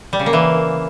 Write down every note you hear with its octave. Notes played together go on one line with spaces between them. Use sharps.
G3
C#3
A#3
E3